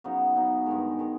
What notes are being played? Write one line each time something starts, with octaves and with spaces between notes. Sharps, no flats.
C#3 F#3 B3 D#4
C#3 F#3 B3 D#4
G2 D#3 G#3
D#3 G#3